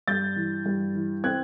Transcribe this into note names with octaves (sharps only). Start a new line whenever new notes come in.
G2 G6 A6
E3
G2
E3
C4 F#6 G#6